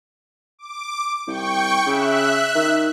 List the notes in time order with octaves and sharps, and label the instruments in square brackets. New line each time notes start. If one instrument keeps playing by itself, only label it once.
[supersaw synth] D6
[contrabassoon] C2 [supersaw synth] G5 C#6
[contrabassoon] C#3 [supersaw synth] E5 F#6
[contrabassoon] D#3